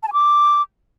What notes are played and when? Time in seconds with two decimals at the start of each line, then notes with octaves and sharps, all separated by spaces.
0.03 A5
0.08 G#5
0.13 D6